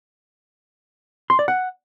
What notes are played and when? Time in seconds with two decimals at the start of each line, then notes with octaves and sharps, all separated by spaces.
1.30 C6
1.39 D5
1.48 F#5